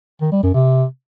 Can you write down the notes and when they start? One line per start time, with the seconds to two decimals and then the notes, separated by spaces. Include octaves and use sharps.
0.21 D#3
0.32 G3
0.43 F#2
0.54 C3